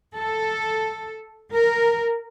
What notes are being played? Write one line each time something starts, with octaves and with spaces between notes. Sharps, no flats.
A4
A#4